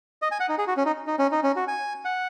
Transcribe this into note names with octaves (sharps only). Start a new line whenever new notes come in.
D#5
G#5
F#5
D#4
G#4
F#4
C#4
D#4
D#4
C#4
D#4
C#4
F#4
G#5
F#5